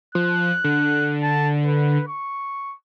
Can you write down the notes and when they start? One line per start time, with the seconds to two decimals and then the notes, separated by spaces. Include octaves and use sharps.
0.15 F3 F#6
0.64 D3
1.23 A5
1.65 B4
2.08 C#6